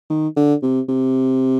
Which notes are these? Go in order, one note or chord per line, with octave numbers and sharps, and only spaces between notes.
D#3
D3
C3
C3